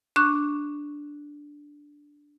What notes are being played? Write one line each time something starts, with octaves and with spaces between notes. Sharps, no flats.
D4 C#6 F#6